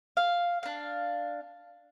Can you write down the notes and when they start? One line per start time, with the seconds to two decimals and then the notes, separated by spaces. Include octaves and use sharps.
0.17 F5
0.63 D4 F5